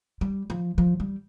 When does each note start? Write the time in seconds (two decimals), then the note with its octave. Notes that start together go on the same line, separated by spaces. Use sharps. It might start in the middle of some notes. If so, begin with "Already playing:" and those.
0.21 G3
0.50 F3
0.78 F3
1.00 G3